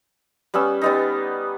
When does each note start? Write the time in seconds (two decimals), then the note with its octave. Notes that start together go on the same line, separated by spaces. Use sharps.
0.54 G3 B3 C#4 E6
0.81 G3 B3 D#4